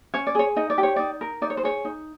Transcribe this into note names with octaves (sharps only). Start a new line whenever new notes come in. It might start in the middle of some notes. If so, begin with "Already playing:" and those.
C#4 C#5
D5
G#4 C#5
D#4 D#5
D5
G4
C#5
D#4 D5
A#4
D#4 D5
C#5
C5
G#4 C#5
D#4